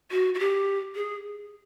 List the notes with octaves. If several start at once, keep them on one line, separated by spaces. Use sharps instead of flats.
F#4
F#4
G4
G#4